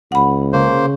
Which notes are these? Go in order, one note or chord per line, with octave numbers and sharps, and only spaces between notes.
C#2 F#5 B5
C#3 A#3 C5